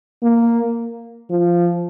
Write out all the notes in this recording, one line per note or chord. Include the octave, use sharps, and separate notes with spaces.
A#3
F3